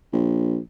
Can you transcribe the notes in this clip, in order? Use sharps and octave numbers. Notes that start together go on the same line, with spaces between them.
A#1